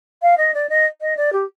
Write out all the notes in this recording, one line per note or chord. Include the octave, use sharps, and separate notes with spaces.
F5
D#5
D5
D#5
D#5
D5
G4